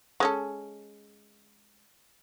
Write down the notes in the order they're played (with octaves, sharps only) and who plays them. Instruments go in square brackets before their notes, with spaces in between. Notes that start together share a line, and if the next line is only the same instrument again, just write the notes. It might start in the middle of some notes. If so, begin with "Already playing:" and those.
[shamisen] G#3 C#4 A4